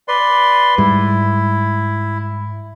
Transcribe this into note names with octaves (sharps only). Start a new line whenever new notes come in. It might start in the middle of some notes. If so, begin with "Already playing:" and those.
B4 D5 C6
G#2 G3 E4